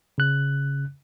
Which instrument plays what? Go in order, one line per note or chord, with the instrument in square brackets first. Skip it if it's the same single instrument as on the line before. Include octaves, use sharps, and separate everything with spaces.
[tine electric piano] C#3 F#6